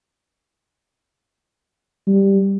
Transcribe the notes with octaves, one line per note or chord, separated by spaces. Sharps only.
G3